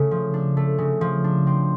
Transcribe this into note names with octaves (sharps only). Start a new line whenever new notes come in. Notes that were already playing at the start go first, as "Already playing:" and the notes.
Already playing: C#3 A3
F3
D4
A3
C#3
F3
D4
C4